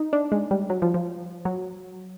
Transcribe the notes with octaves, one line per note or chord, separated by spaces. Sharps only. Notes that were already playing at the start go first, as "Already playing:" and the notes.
Already playing: D#4
D4
G#3
G3
F#3
F3
F3
F#3